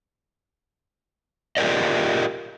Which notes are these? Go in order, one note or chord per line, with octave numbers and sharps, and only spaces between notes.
F4 G4 G#4 A#4 D5 D#5